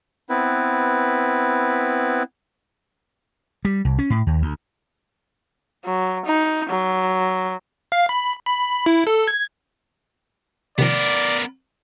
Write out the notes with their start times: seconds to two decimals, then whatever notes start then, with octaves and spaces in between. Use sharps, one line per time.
0.30 B3 C4 E4 B4
3.65 G3
3.85 C2
3.99 C#4
4.10 A2
4.27 D#2
4.42 D2
5.86 F#3
6.26 D#4
6.70 F#3
7.92 F5
8.09 B5
8.47 B5
8.86 E4
9.07 A4
9.28 G#6
10.78 C3 D#3 F3 B3 A#4 D5